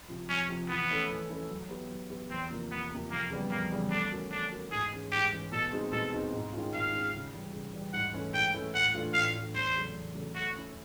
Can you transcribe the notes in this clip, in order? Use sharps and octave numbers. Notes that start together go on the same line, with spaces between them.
C3 F3
F2 C#4
C3 F3
E3 B3
A3 C#4 E4 A4
E3
A3 C#4 E4 A4
F#3
B3 E4 G4
F#3
B3 E4 G4
E2 C4
C3 F3 A#3
E2 B3
C3 F3 A#3
F2 A#3
C#3 E3 G3 B3
F2 A#3
C#3 E3 G3 B3
A3 D4
C#4 F#4 A#4
A3 D4
C#4 F#4 A#4
G#2 G#4
E3 G#3 C#4
G#2 G4
E3 G#3 C#4
B2 A4
G#3 C4 D#4 F#4
B2 A4
G#3 C4 D#4 F#4
G#2
D#3 G#3 C#4 F4
G#2 F5
D#3 G#3 C#4 F4
C#3
E3 G3
C#3
E3 G3
G#2 F#5
E3 A3 C#4 E4
G#2 G5
E3 A3 C#4 E4
A2 F#5
E3 A3 D4 F4
A2 F5
E3 A3 D4 F4
E2 C5
C#3 F#3 A3
E2
C#3 F#3 A3
A3 F#4
C#4 E4